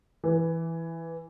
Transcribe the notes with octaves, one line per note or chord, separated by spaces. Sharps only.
E3